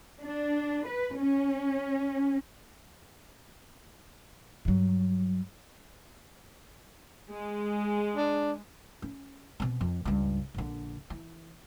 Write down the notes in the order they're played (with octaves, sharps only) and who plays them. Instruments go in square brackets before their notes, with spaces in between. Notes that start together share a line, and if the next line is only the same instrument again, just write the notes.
[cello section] D4
B4
C#4
[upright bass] G2 F#3
[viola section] G#3
[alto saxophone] D4
[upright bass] C#4
B2 C4
F2
C#2 G2
A#1 D3
E3